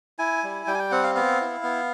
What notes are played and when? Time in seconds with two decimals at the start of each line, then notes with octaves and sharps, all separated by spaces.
0.19 E4 G#5
0.44 G3
0.67 G3 G5
0.74 G#5
0.79 G5
0.91 C4 F#5
1.03 F5
1.15 B3 F5
1.41 E4
1.63 B3